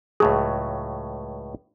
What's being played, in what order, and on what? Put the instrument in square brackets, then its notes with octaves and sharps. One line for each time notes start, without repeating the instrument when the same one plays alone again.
[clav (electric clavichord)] C#2 A2 F#3 [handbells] G#4